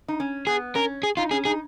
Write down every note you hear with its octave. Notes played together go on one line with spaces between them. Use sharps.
D#4
C#4
B3 G#4
C#4 A#4
G#4
D#4 F4
C#4 G#4
D#4 G#4